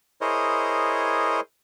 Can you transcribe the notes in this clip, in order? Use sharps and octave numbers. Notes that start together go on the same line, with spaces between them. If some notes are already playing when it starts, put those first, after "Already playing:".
E4 G#4 A#4 C5 C#5 D#5